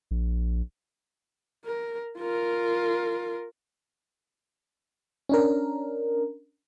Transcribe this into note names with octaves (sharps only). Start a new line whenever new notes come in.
A#1
A#4
F4 A#4
C#4 D4 A#4